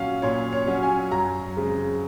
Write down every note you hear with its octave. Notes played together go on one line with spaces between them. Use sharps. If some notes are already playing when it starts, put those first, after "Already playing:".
Already playing: A#2 F#3 C#4 F5
A#2 C#5
C#5
F#3 C#4
G#5
F#2 A#5
C#3 G#3 C4